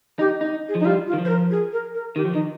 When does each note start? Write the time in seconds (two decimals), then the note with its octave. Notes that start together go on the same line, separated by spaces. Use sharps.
0.19 D#4 G4
0.41 D#4
0.68 G#4
0.75 F3
0.80 D#4
0.85 G3 F4
1.07 F4
1.13 D#3
1.18 F3
1.25 C5
1.29 A#4
1.51 G#4
1.72 A#4
1.94 A#4
2.16 D#3 G4
2.25 F3
2.33 D#3 D#4